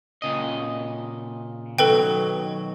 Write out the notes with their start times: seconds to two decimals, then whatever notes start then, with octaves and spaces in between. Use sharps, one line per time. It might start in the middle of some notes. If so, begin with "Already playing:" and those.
0.22 A#2 C#3 D#5
1.79 B2 D#3 F#3 A4 B4 G5